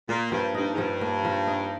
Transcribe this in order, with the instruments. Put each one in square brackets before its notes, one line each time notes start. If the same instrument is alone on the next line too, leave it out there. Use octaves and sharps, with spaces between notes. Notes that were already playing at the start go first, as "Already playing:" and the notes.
[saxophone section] A#2 [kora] A#3
[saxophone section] G2 [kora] F3
[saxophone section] G2 [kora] D#4
[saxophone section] G#2
[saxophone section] G2 [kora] F3
[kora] A#3
F3
D#4